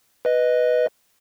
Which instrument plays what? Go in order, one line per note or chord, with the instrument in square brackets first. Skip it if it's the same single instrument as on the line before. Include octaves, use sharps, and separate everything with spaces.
[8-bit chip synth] B4 D#5